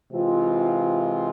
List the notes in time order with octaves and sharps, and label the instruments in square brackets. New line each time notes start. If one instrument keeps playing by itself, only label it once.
[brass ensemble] C3 E3 G#3 C4 F4